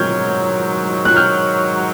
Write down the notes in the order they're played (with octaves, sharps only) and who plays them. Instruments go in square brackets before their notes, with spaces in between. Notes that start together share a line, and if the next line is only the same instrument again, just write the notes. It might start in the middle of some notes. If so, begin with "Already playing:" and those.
Already playing: [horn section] G#2 D#3 F#3 [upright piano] F6 G6 G#6
[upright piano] F#6
F6 G6